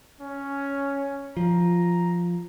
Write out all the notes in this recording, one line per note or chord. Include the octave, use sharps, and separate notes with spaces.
C#4
F3 A#5